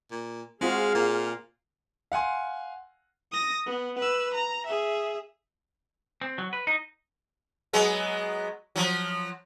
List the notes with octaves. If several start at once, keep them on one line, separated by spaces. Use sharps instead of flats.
A#2
G#3 C4 F4 F#4 G#4 F5
A#2
F5 F#5 G#5 C6
D#6 A#6
B3
B4 E6
A#5
G#4 E5
C4
F#3
B4
D#4
F#3 G#3 B3
F3 F#3